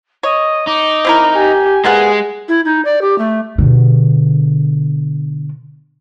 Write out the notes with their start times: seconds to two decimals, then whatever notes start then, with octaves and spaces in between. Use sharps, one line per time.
0.23 C#5 D#5
0.67 D#4 D6
1.05 C4 E4 A#4
1.34 G4 G#5
1.84 G#3 A#3 B3 G#4 F#5
2.49 E4
2.65 D#4
2.85 D5
3.02 G4
3.18 A3
3.58 B2 D3